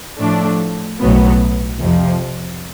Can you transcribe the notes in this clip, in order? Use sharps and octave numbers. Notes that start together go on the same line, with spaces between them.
A2 F3 A3 D4
B1 A2 F#3 B3
F2 C3 F3